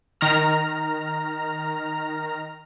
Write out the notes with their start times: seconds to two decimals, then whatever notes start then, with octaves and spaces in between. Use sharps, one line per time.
0.21 D#3 A#5 F6